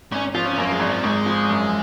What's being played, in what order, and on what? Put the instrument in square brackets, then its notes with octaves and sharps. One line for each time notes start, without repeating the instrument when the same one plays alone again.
[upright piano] G#1 [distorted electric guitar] C#4
[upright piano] F3 [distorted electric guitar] F4
[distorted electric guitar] C#4
[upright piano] F#2 [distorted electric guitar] A#3
[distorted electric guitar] G#3
[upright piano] G#1
[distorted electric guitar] F3
[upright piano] G#1 [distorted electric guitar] G#3
[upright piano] F3
F#2